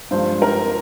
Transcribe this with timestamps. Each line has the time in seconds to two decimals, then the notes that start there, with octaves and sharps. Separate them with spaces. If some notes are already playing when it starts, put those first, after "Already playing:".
0.11 G2 F3 G#3 C5
0.42 A#4